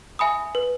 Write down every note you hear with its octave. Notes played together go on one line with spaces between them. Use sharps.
E5 G#5 B5 D#6
B4